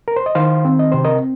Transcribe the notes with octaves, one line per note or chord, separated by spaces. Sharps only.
A#4
C5
D#5
D#3 C5 F5
C4
D#5
C3 C5
A#4 D#5